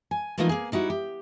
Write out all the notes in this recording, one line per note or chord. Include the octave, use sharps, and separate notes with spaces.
G#5
E3 F3 A3 A#3 D#4 F4
A#3 G#4
G3 D#4 E4 F#4
G4